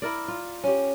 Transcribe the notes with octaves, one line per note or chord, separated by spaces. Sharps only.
E4 A#4 D5
F4
C#4 G4